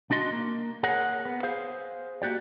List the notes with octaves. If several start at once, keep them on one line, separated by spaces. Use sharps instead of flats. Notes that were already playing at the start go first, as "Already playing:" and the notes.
C2 D4 F#4 D#5 C6
A#3
G#4 A#4 C#5 F#5
B3
G#4 C5 F5
A#3 F#4 G4 D5